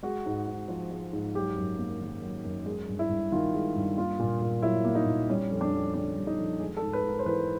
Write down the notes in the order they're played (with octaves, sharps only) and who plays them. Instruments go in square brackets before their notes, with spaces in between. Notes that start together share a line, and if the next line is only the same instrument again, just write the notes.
[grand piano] G#3 F#4
G#2
G#2
F3
G#3
G#2
F#3 G4
F#2
A#3
D#3
F#3
F#2
G#3
G2
E4
G2
D#3 F4
G#3
G2
A#3 F4
A#2
A#2
F#3 E4
A#3
D#4
A#2
G3 C#4
F2
D4
F2
D3 D4
G3
D#4
F2
G#3 G#4
A4
G#2
B4
G#2
A#4
C5
E3 B4